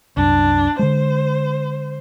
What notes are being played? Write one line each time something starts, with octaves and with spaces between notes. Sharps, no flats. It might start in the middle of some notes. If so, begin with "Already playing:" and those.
C2 F#2 D4
D3 G#3 C5